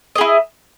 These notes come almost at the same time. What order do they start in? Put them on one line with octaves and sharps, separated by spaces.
D#5 G#4 E4